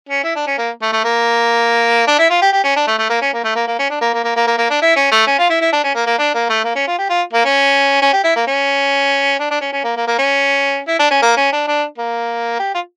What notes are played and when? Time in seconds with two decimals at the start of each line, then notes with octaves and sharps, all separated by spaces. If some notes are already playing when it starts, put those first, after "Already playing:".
0.09 C#4
0.24 E4
0.35 D4
0.47 C#4
0.58 A#3
0.82 A3
0.92 A3
1.04 A#3
2.07 D4
2.19 E4
2.30 F4
2.42 G4
2.53 G4
2.64 C#4
2.76 D4
2.87 A3
2.99 A3
3.10 A#3
3.22 C#4
3.33 A#3
3.44 A3
3.55 A#3
3.67 A#3
3.79 C#4
3.90 D4
4.01 A#3
4.13 A#3
4.24 A#3
4.36 A#3
4.47 A#3
4.58 A#3
4.70 D4
4.82 E4
4.96 C#4
5.12 A3
5.27 C#4
5.39 F4
5.50 E4
5.61 E4
5.72 D4
5.84 C#4
5.95 A#3
6.07 A#3
6.18 D4
6.34 A#3
6.50 A3
6.64 A#3
6.76 C#4
6.87 F4
6.98 G4
7.10 F4
7.33 A#3
7.45 C#4
8.02 C#4
8.13 G4
8.24 E4
8.36 A#3
8.47 C#4
9.39 D4
9.51 D4
9.61 C#4
9.73 C#4
9.84 A#3
9.97 A#3
10.07 A#3
10.18 C#4
10.88 E4
10.99 D4
11.11 C#4
11.22 A#3
11.37 C#4
11.52 D4
11.68 D4
11.98 A#3
12.59 G4
12.75 F4